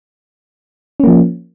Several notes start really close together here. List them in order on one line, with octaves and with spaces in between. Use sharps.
C#4 A#3 F3